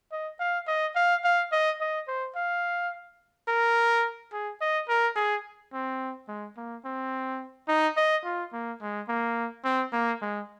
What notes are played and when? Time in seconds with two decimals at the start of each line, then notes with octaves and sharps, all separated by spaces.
0.12 D#5
0.39 F5
0.67 D#5
0.96 F5
1.24 F5
1.52 D#5
1.81 D#5
2.08 C5
2.36 F5
3.48 A#4
4.32 G#4
4.61 D#5
4.89 A#4
5.16 G#4
5.73 C4
6.28 G#3
6.57 A#3
6.85 C4
7.68 D#4
7.97 D#5
8.24 F4
8.53 A#3
8.81 G#3
9.08 A#3
9.64 C4
9.93 A#3
10.21 G#3